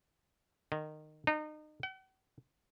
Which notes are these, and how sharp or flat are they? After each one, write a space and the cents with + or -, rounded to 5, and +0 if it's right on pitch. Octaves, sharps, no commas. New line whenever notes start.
D#3 -20
D#4 -30
F#5 +45